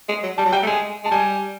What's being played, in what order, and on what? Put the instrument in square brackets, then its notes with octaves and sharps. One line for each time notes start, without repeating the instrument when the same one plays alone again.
[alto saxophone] G#3
F#3
[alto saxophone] G3 [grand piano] A5
[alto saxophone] F#3
[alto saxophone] G3 [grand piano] G5
[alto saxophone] A3
[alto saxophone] G#3 [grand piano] G#5
[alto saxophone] G#3 [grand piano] A5
[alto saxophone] G3 [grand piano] G#5